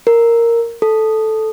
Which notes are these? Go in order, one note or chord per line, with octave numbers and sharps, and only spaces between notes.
A#4
A4